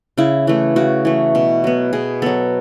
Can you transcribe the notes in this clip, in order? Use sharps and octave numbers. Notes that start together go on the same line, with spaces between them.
C#3 E4
E3 A3
C#3 F#4
E3 A3
B2
F#3 B3
B2 G#4
F#3 B3 A4